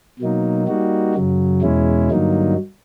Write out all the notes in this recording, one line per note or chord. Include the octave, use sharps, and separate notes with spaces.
B2 F#3 A#3 D#4
G3 A#3 D#4 F#4
F#2 C#3 F#3
E2 B2 G#3 C#4 E4
G2 D3 F#3 A#3 D#4